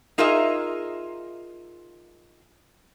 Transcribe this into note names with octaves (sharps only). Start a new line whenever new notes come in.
D#4 F4 G#4 A#4 D#5 E5